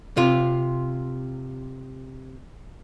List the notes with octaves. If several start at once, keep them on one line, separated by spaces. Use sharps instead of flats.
C3 F4